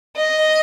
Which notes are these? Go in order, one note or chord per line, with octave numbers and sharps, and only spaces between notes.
D#5